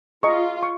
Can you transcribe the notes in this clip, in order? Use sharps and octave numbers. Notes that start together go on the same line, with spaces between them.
F4 G#4 D#5 A#5 C#6
C#6